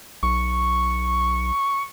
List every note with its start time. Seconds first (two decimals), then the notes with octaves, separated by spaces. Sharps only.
0.23 B1 C#6